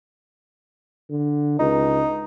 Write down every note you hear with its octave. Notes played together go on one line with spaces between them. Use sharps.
D3
C#2 D#4